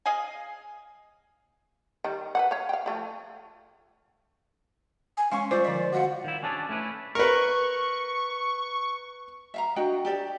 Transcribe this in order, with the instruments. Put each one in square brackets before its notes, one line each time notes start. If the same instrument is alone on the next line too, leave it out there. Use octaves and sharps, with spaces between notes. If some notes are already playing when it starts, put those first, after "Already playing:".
[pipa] G#4 D#5 F5 G#5
[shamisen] D#3 G3
B4 C5 F#5
C#5 F5
F5 G5
F3 A3 E4
[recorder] G#5
[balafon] G#3 F5 G#5 [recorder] C#4 [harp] C6 C#6
[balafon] G3 F4 D6 [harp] C5 [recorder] D5
[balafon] D3 F3 D#5 [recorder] D5
[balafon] F#4 D#5 F5 [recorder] F#5
[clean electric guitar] D#3 E4
C#4 D4 G#4 A4 B4 D5
A3 C#4 E4 B4
[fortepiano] A#4 B4 [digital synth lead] C#6
[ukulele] E5 F5 A#5
D4 F#4 D#5 G5
G4 A4 D5